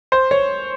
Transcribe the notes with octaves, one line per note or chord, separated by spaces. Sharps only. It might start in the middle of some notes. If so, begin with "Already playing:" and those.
C5
C#5